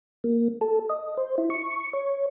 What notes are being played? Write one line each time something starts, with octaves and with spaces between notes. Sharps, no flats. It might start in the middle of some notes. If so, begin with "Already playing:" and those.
A#3
A4
D#5
C5
E4
C#6
C#5